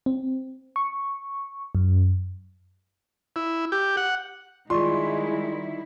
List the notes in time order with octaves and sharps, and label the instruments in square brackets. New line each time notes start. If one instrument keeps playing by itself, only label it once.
[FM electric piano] C4
C#6
F#2
[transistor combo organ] E4
G4
F#5
[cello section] D#3 G3 E4 [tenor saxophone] G#3 [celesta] F4 D5 C#6 [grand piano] C6